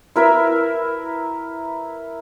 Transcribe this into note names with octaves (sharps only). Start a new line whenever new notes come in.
E4 A#4 B4 E5